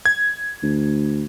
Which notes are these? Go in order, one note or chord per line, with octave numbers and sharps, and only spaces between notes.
G#6
D2